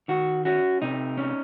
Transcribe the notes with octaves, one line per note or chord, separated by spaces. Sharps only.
D#3 F#4
C#4 F#4
C3 D#4
C#4